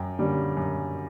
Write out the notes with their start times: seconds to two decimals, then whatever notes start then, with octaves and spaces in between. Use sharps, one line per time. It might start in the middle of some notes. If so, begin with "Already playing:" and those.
Already playing: F#2 G5
0.19 D3 G3 A#3 C#4
0.57 F#2